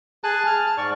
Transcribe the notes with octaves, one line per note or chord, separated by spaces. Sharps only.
G#4 G#5 A5 F#6
F6
G#2 D5 C#6